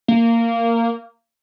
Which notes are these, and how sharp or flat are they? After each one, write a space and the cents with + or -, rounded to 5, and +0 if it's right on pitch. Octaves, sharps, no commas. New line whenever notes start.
A#3 -15